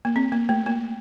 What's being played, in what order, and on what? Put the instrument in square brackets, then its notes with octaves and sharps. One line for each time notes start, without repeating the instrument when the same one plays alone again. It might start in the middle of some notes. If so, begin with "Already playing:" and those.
[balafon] A#3
C4
A#3
A3
A#3